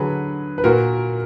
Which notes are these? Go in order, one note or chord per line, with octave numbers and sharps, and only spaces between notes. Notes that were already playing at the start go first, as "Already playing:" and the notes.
Already playing: D3 F#3 G#4 B4
B4
A#2 F#4 A#4